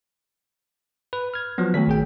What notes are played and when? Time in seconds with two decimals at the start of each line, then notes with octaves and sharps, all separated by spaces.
1.13 B4
1.34 F6 G#6
1.58 F3 F#3 B3
1.74 D#3 A3 F#4 A4 B6
1.88 A#1 G#4 G5